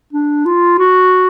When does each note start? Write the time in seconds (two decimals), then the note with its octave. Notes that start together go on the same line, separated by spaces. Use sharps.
0.13 D4
0.46 F4
0.78 F#4